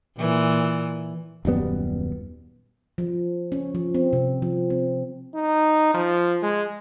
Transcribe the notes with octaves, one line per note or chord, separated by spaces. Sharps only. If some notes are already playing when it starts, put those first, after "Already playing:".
A#2 E3
D#1 F#2 G3 B3
F3
C#4
F3
C4
C3
F3
C4
D#4
F3
G#3